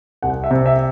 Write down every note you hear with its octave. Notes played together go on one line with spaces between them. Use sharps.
C2 F#5
E5
C3
E5